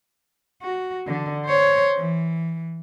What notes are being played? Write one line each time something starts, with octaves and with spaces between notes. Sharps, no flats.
F#4
D3
C5 C#5
E3